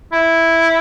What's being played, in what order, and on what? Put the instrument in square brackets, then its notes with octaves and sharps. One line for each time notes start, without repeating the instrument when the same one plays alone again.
[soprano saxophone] E4